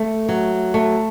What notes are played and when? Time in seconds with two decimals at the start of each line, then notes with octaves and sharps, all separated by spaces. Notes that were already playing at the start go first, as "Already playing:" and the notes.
Already playing: A3
0.29 F#3
0.74 A3